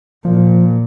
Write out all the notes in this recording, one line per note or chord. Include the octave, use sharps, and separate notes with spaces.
A#2 F3